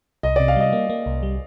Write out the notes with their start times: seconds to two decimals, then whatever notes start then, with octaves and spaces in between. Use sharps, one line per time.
0.23 C2 D#5
0.36 C3 D5
0.48 F5
0.56 G3 D#5
0.73 A#3
0.90 A#3
1.06 C2
1.23 G3